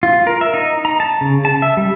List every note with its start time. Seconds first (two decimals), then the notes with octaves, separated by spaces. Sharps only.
0.03 F4
0.27 A#4
0.41 E5
0.54 D#4
0.85 A#5
1.00 A5
1.21 C#3
1.45 A5
1.62 E5
1.77 G3